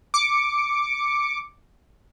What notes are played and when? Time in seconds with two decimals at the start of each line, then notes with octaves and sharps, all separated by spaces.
0.14 D6 C#7